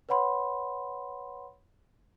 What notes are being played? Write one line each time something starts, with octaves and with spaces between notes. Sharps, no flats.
B4 C#5 F#5 B5 C6